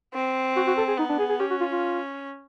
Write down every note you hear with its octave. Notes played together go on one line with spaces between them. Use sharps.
C4
F#4
F#4
A4
G#4
B3 D#4
D4
G#4
G#4
C#4 G4
F#4
F4
F4